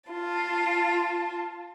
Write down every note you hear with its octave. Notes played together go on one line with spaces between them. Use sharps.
F4 A5